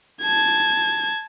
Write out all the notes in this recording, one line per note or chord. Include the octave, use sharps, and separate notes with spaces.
A5 G#6